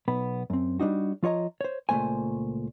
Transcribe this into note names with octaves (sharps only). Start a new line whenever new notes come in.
B1 B3 B5
F#2 C4
G3 G#3 D4 D#4 F#4
F3 F4 C#5 D#5 A#5
C5 C#5
C#2 A#2 G#3 A3 C5 G#5